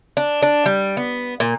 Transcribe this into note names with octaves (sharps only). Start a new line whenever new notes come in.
D4
D4
G3
B3
A#2